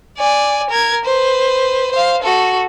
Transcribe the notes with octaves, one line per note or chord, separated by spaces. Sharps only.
D5 G#5
A#4 G#6
B4 C5
C5 F5
F#4 A4